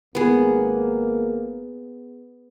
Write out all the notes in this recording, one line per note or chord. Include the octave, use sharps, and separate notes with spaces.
G#1 A#3 B3 G#4